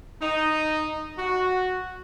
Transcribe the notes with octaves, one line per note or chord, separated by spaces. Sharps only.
D#4
F#4